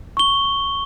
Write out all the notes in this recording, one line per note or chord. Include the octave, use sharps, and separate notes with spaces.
C#6 G7